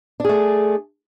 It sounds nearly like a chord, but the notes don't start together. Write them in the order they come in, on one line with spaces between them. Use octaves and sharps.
D4 G#4 A3